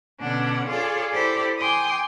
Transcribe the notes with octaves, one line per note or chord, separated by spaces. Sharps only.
B2 D3 C#4 D4 F#5
F4 G#4 A4 C#5 D5
E4 G4 A4 C5 D5
G5 G#5 C6 D6 D#6